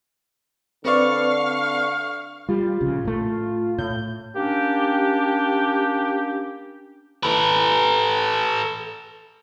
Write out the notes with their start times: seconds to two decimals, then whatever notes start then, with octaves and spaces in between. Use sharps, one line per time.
0.85 D3 C4 B4 D5 F5 C#6
2.49 G3 F4
2.81 A#1 C#3
3.05 A2 A3
3.78 A2 G6
4.34 A#3 C#4 D4 G4
7.23 A4 B4